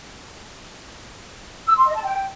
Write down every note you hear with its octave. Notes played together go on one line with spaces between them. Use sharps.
E6
C6
D#5
A5
G5